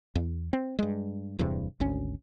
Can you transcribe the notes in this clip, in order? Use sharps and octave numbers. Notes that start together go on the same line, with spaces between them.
E2
C4
G2 G#3
D1 E2 G2 C3
G#1 D2 C#4